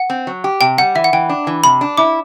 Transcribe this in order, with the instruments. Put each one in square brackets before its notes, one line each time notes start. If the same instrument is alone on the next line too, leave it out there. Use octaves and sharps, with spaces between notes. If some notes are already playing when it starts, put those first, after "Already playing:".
Already playing: [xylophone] F#5
[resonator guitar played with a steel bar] C4
F#3
G4
[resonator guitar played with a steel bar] C3 [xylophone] G5
[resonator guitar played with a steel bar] G3 [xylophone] F#5
[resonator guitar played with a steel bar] E3 [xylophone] E5
[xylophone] F#5
[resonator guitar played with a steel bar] E3 [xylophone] G5
[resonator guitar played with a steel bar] D4
E3
[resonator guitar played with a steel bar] C3 [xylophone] B5
[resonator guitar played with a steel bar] D4
[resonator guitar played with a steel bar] E4 [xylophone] D6